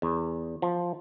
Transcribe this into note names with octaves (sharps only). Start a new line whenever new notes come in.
E2
F3